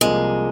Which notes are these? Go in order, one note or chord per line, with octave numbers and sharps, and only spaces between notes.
C2 C3 F3 G#3 A#3